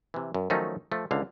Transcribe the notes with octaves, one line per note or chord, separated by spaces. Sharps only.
C3 E3
F#2
D#3 F3 F#3 A3 C#4 D#4
F3 A3
C#2 D3 F5